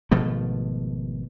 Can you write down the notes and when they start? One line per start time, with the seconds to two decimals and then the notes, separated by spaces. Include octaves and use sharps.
0.11 G#1 B2 F3 A3